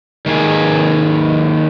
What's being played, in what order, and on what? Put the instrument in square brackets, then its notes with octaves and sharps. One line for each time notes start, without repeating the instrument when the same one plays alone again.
[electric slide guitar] D#3 A#3 G#4